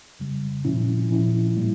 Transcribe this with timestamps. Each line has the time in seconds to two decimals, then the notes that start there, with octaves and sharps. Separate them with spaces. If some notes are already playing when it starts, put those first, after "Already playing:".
0.19 F2 C#3 G3
0.65 A#2 F3 C#4 E4
1.10 A#2 F3 C#4 E4
1.56 A2 G3 A#3